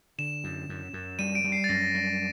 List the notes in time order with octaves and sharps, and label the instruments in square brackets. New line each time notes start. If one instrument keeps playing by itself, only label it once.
[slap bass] D3 [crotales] E7
[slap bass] F#2
F#2
F#2
[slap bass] G3 [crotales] D#7
[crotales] D7
[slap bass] G3
[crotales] C7
A6
[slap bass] F#2 [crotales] A#6
[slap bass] G3